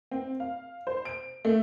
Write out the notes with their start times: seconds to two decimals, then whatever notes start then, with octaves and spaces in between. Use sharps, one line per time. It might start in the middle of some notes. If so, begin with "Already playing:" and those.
0.11 C4
0.40 F5
0.87 C5
1.05 D7
1.45 A3